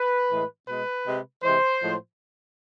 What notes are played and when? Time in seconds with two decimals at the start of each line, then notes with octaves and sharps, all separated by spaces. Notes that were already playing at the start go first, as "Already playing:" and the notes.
Already playing: B4
0.30 A2 E3 G#3
0.67 B2 G#3 B4
1.05 C3 G#3
1.43 C3 E3 G#3 C5
1.81 A2 F3 G#3